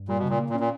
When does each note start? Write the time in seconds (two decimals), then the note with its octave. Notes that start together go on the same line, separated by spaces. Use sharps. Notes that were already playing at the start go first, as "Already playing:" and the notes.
Already playing: G2
0.09 A#2 G3
0.19 B2
0.24 C#3
0.29 A#2
0.39 A#3
0.50 A#2
0.55 C#4
0.60 A#2